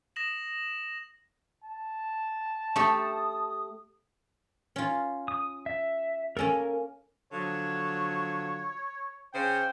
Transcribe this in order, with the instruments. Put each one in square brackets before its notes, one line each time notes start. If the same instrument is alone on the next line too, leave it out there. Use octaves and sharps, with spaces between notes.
[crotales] D#6 A#6 E7 F#7
[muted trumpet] A5
[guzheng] A3 G4 A4 [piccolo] D#6
[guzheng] C#4 F4
[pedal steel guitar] D#6
E5
[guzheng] A#3 C#4 A4 [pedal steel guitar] A#4 G#5
[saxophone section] D3 F3 F#3 [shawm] C#5
[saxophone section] C#3 G#4 C5 [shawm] G5